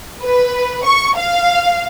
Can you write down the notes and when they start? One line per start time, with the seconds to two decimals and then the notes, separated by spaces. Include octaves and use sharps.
0.23 B4
0.84 C#6
1.17 F5